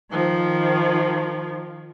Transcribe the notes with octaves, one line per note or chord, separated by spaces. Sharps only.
D#3 F3